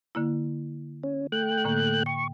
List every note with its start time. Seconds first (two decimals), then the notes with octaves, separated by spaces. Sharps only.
0.15 D3 A#3 E4
1.03 C#4
1.32 A3 G5 F#6
1.64 A2 D3 A#3
2.06 G5 C#6